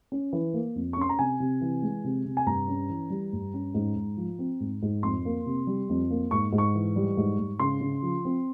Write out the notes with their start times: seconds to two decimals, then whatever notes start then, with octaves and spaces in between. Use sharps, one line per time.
0.12 C#4
0.33 E3
0.54 A#3
0.75 F2
0.93 C#6
0.97 C#4 C6
1.09 A#5
1.19 C3 G#5
1.40 C3
1.61 E3
1.82 G#3
2.04 C3
2.25 C3
2.37 G#5
2.46 G2 A#5
2.68 C#4
2.90 E3
3.10 G3
3.33 G2
3.54 C#4
3.75 G#2
3.96 G#2
4.17 F3
4.39 C4
4.60 G#2
4.83 G#2
5.03 F2 C6
5.25 A#3
5.46 C3
5.67 G3
5.89 F2
6.10 A#3
6.31 G#2 C#6
6.53 G#2
6.58 C#6
6.75 E3
6.96 G3
7.17 G#2
7.39 G#2
7.59 C#3 C6
7.81 C#3
8.02 F3
8.25 C4